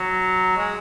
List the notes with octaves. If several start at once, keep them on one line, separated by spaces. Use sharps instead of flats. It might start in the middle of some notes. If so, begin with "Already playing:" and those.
Already playing: F#3
G#3